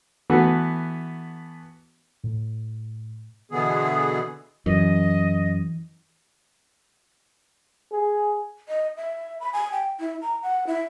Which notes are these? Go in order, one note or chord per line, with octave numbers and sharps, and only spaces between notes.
E3 A3 B3 F#4
A2
B2 D3 E3 B3 G#4
F#2 E3 D#5
G#4
D#5
E5
B5
G#5
G5
E4
A#5
F#5
E4